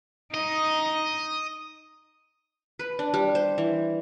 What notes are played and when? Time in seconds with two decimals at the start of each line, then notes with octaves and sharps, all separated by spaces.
0.34 D#4 D#5
2.79 B4
2.99 D4
3.14 G3
3.35 C5
3.58 E3